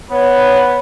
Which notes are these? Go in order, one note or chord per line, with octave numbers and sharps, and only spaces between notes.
B3 B4 C#5